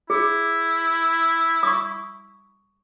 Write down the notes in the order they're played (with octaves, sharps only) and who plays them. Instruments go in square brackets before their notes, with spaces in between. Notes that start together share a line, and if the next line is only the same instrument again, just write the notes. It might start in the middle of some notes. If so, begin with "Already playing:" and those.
[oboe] E4 [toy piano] G#4
[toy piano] C#6 D#6